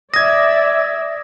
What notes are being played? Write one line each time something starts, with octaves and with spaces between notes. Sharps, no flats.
D5 E5 D#6 G#6 A#6